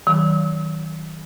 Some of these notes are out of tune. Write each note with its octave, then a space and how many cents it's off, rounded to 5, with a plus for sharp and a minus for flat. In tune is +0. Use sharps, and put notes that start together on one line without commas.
D#3 +35 F#3 +30